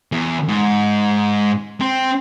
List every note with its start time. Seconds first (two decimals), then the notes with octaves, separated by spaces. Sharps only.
0.12 E2
0.49 G#2
1.81 C4